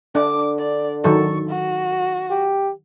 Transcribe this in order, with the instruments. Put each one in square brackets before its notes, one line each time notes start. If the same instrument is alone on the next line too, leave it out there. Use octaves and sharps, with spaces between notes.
[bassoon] D3 [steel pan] D4 [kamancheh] D6
[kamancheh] D5
[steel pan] D#3 F#3 A4 [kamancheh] C#6
[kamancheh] F#4
[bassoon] G4